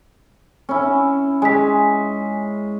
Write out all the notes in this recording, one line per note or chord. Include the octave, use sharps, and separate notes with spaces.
C#4 E4
G#3 G#5 B6